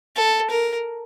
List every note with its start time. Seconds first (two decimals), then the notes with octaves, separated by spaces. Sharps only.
0.16 A4
0.50 A#4